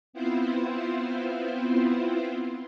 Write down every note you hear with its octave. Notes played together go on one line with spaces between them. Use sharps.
B3 C4 E4 F4 C5